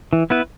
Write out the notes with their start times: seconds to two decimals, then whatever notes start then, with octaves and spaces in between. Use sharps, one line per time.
0.13 E3
0.30 B3 E4 B4